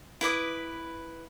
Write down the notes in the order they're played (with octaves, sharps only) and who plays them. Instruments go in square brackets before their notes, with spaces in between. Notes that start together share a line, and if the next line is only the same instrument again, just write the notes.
[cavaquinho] E4 B4 D6 D#6